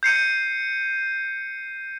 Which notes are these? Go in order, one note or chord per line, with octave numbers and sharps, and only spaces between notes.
G6 C7 C#7 D#7